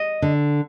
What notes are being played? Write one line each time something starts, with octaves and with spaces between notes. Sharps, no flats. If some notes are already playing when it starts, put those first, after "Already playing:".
Already playing: D#5
D3